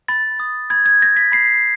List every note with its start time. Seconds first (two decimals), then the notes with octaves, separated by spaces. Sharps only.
0.08 B5 A6
0.40 D#6
0.70 B5 G#6
0.86 G#6
1.02 G6 A#6
1.17 B6
1.32 B5 C7